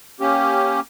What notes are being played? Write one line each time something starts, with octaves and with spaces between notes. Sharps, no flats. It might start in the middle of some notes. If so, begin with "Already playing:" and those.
A#3 C#4 G4